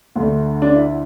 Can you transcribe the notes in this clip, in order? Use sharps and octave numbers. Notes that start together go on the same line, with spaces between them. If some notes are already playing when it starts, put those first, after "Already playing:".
D2 D3 A3
D4
E4